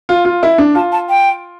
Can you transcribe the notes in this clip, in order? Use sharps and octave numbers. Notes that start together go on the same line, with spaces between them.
F4
F4
E4
D4
F4 A5
A5
G5